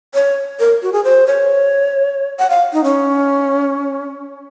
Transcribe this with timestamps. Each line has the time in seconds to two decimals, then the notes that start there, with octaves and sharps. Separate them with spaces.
0.14 C#5
0.60 A#4
0.82 F#4
0.93 G#4
1.04 C5
1.27 C#5
2.39 F#5
2.50 F5
2.73 D#4
2.84 C#4